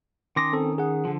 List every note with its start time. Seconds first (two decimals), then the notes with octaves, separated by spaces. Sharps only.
0.36 D#3 C#4 C6 D6 D#6 A#6
0.53 C4 A4
0.78 G#4 F#5
1.05 D3 F3